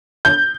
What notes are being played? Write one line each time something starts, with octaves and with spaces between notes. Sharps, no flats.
G6